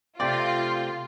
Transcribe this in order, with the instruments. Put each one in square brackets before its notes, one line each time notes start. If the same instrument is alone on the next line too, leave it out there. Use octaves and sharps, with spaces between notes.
[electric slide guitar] C3 A3 C4 [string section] F4 [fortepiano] D5 G5